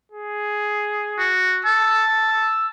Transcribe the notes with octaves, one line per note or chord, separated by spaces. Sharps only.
G#4
F#4
A5 E6
E6